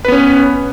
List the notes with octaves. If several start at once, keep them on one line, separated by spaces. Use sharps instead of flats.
B3 C#4 B4